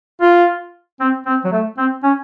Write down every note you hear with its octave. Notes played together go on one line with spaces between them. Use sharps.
F4
C4
C4
F#3
A3
C4
C#4